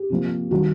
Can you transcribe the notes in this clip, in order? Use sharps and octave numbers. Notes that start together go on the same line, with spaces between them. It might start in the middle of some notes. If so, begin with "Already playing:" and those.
Already playing: G4
C3 F3 A#3
D#3 G3 F#4